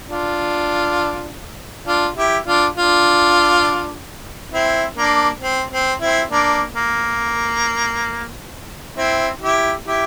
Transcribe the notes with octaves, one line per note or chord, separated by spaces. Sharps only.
D4 F4
D4 F4
E4 G4
D4 F4
D4 F4
C4 E4
A#3 D4
C4
C4
C4 E4
A#3 D4
A#3
C4 E4
E4 G4
E4 G4